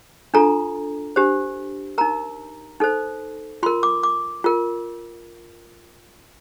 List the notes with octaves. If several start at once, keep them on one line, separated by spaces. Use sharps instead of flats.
D4 F4 A4 A#5
D4 G4 C5
D#4 A#4 A#5
D#4 A4 C5
F4 A#4 C6
D6
D6
F4 A#4